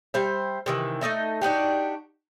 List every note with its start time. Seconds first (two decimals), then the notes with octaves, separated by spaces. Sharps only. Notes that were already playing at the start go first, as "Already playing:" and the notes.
0.14 G3 C5 E5
0.66 C3 D#3 E3
1.01 A3 D#4 D#5 E5
1.41 D4 D#4 F#4 G4